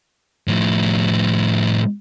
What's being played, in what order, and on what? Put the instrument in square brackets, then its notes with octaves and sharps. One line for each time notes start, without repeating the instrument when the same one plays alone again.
[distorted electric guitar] A2 F3